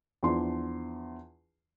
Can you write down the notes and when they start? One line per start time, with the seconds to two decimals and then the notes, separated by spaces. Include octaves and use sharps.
0.23 E2 F3 D4 C6